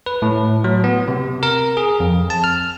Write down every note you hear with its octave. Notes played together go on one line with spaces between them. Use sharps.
B4
A2
F#3
B3
C3
A#4
G#4
F2
A5
F6